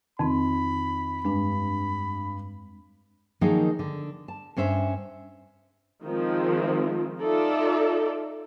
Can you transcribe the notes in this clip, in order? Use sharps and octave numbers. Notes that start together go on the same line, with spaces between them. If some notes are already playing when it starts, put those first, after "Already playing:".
F2 D#3 C4 B5
G2 G#3 D4
D#3 F3 F#3 A#3 D#4 G#4
D3
A5
G2 C#4 C5 E5
D#3 F3 G#3 C4
D#4 F4 A4 D5 E5